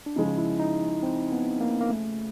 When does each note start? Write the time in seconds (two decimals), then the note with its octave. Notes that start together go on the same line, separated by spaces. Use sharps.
0.06 D4
0.16 C#3 F3 G#3 D#4
0.38 E4
0.60 D#4
1.03 C4
1.32 B3
1.61 A#3
1.81 A#3
1.90 A3